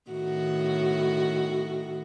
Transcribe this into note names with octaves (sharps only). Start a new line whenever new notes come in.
A2 D#3 F#4